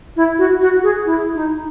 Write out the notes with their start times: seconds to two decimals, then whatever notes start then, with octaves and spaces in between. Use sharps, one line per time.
0.16 E4
0.38 F#4
0.61 F#4
0.83 G#4
1.06 E4
1.35 D#4